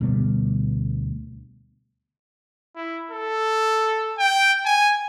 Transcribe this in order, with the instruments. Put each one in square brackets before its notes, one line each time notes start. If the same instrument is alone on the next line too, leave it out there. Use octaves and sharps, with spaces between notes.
[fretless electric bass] D2 B2 G3 B3
[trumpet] E4
A4
G5
G#5